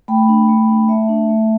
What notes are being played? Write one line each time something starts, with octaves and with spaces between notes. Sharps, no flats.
A3 G5 B5
D4
A3
D4
A3 E5 A5
D4
A3